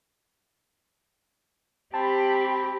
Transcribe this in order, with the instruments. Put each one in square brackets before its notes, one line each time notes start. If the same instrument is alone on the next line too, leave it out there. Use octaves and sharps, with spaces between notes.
[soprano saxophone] C4 [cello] G4 [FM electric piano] A5 [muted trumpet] B5